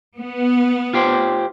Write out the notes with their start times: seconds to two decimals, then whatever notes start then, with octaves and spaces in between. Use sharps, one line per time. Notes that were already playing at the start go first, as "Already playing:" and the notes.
0.17 B3
0.93 F4 G4 C5